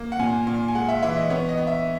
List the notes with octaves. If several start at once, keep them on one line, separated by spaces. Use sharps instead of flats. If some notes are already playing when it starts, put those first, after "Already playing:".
Already playing: A#3
F#5
A#2 G#5
A#2
G#5
G#3 F#5
E5
E3 E5
D#5
B3 C#5
D#5
B3
E5